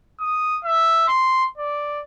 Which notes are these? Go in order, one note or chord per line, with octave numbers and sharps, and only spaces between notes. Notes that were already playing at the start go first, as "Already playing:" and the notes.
D#6
E5
C6
D5